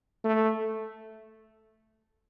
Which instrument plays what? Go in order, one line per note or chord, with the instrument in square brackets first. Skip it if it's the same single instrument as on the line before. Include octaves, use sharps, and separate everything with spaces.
[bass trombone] A3